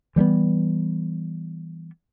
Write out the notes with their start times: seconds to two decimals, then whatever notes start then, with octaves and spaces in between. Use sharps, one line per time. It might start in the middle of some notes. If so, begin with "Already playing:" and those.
0.16 E3 G3 A3 B3